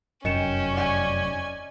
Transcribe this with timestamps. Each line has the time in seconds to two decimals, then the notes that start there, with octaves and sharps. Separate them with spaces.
0.25 F1 F#2 C#4 D#5 G5 C#7 E7
0.72 D5 G#5